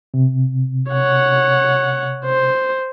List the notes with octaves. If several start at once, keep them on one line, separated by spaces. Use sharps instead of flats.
C3
C#5 F#5
C5